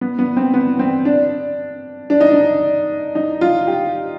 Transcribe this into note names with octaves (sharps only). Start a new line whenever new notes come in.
B3
B3
C4
B3
C4
D4
D4
D#4
D4
D#4
F4
G4